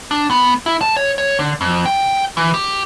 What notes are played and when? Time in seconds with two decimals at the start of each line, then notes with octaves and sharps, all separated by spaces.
0.11 D4
0.31 B3
0.66 E4
0.81 A5
0.97 C#5
1.18 C#5
1.39 D3
1.61 F2
1.86 G5
2.37 E3
2.54 G4